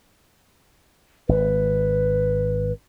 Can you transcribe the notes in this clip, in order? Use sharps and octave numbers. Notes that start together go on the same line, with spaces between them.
G#1 B4